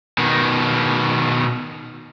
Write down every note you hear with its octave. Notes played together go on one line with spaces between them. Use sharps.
B2 D#3